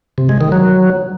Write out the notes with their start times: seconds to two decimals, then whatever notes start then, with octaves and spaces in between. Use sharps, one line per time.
0.18 C3
0.29 G#3
0.41 D#3
0.52 F#3